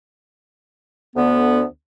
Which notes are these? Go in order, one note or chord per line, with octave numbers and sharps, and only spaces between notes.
D2 D3 B3